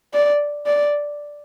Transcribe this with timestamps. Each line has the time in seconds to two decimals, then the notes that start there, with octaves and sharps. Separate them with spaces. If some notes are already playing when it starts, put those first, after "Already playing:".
0.13 D5
0.66 D5